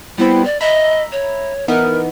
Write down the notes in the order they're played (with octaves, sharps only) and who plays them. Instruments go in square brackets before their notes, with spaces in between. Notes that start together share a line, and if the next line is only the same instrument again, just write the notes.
[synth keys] G3 B3 C4 [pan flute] E4
[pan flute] D5
[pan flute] D#5 [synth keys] E5 A#5 B5
[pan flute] C#5
[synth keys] E3 B3 D#4 [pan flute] A#4